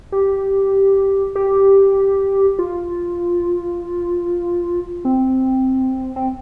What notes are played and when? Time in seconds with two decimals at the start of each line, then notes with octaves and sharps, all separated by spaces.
0.12 G4
1.36 G4
2.59 F4
5.05 C4
6.16 C4